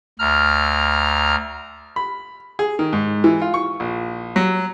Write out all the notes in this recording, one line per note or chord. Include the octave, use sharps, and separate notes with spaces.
D2 A#5 F6
B5
G#4
D#3
G#2
E3
F4
C#6
A#1
F#3